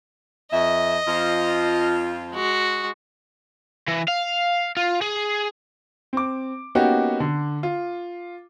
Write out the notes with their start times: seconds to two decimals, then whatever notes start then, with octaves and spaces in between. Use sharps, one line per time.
0.52 F2 D#5 E5
1.08 F2 F3 F4
2.33 G#3 F#4
3.88 E3
4.08 F5
4.77 F4
5.02 G#4
6.13 C4 D6
6.75 A#3 B3 C#4 D#4 F#4 G4
7.20 D3
7.63 F4